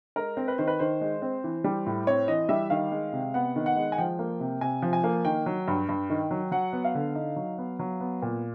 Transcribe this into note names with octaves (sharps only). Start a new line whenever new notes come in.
G#3 A#4
C4
B4
D#3 C5
B4
D#3 C5
G#3
C4
E3
G3
A2
C4 C#5
E3 D#5
G3 E5
D#3 F5
G#3
C3
B3 F#5
D#3
F#5
G#3
G#5
F3 G5
A#3
C3
C3 G#5
F3
G#5
A#3
D#3 G5
F#3
G2
G2
D#3
F#3
F#3 F#5
B3
F5
D3
D#4
F#3
B3
F#3
B3
A#2